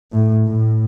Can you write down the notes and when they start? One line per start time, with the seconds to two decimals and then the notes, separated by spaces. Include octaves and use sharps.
0.13 A2
0.45 A2